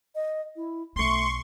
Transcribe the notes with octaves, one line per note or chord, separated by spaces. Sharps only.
D#5
E4
B1 A3 C#4 C6 C#6